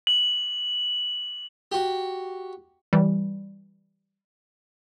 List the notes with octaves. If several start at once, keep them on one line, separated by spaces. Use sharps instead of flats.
F#7
F#4 G4
E3 G3